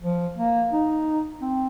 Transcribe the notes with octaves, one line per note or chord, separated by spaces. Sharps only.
F3
A#3
D#4
C4